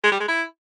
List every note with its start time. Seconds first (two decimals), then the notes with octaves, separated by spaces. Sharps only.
0.04 G#3
0.12 G3
0.20 G#3
0.28 E4